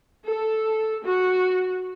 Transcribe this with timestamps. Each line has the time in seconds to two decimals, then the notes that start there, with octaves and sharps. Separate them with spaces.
0.24 A4
1.04 F#4